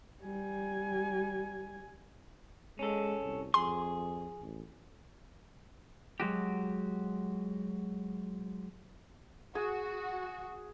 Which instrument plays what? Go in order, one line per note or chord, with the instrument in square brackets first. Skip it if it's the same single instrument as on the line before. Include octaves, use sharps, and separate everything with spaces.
[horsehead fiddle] G3 G#5
[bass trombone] G#3 [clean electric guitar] C#4 A4
[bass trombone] C2
[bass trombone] F2 [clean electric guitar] G#4 [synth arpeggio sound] C6
[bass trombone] A1
[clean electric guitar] F#3 G#3 F#4 G4
[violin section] F#4 [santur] G#4